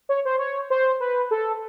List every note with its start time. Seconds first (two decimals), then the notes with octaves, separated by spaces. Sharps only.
0.09 C#5
0.25 C5
0.39 C#5
0.70 C5
1.00 B4
1.31 A4